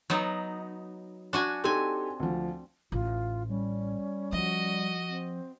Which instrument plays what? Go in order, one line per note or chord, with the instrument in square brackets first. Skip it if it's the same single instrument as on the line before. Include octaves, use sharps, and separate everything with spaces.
[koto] F#3 B3 D#4
D4 F#4 G#5
[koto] C4 G#5 [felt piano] D#4 G4 A4
[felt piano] D2 F3
[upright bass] A1 [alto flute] F4
[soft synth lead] G3 [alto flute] C#4
[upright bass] F3 [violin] F#4 D#5
[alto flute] C4